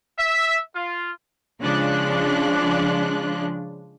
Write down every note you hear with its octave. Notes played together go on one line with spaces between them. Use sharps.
E5
F4
C#3 F3 G#3 D4 F4 F#6